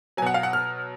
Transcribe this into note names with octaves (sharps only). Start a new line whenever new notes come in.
B2 F#3 F#5 G#5
F5
F#5
F6